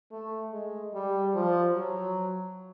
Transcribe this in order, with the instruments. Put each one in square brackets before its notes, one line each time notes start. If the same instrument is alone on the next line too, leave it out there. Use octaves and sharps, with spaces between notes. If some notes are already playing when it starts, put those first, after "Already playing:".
[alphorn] A3
G#3
G3
F3
F#3